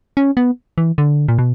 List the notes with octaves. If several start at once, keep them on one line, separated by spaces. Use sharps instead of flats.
C#4
B3
E3
D3
A#2
B2